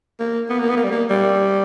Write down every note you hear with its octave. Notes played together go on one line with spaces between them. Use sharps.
A#3
B3
A#3
B3
A#3
G3
A#3
G3